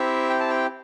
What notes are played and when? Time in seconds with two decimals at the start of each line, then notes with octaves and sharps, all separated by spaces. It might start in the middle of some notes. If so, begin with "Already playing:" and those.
Already playing: C4 E4 G4 E5
0.30 G5
0.40 A5
0.50 G5